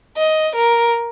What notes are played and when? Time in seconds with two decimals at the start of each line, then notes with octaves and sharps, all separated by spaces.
0.17 D#5
0.55 A#4